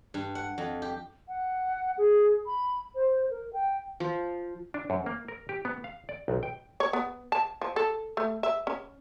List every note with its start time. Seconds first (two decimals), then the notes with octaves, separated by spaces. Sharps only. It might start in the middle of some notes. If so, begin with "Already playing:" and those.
0.14 G2
0.35 F#5
0.58 F2
0.82 G4
1.28 F#5
1.98 G#4
2.46 B5
2.95 C5
3.30 A#4
3.53 G5
4.00 F3
4.74 D4
4.90 F#2
5.06 A#3
5.28 A#4
5.49 G4
5.65 B3
5.84 F5
6.09 D5
6.28 B1
6.43 G5
6.80 C#5
6.93 B3
7.32 A5
7.61 F3
7.76 A4
8.17 A3
8.43 E5
8.67 C#4